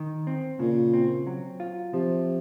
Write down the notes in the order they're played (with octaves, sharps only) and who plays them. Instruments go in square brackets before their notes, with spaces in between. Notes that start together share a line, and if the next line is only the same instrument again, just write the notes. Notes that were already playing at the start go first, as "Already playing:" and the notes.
Already playing: [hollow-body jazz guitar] D#3
C4
[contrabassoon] A#2 [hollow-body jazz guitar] C#3
[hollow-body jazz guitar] C4
F#3
F4
[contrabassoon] C3 [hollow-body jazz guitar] F3